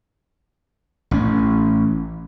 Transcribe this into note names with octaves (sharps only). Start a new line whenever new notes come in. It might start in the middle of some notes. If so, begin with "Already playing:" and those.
A1 C#4